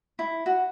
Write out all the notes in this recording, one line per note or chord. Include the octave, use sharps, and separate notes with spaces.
E4
F#4